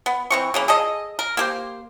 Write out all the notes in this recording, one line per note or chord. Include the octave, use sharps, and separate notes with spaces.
B3
E3 C4 C#6
C#3 E3 A#3
G#4 A4 D#5
A#4
A#3 G4 C5